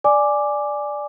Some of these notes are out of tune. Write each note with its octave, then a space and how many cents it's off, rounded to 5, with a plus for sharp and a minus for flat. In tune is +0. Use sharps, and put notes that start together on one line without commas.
D5 +0 G#5 +0 D6 +0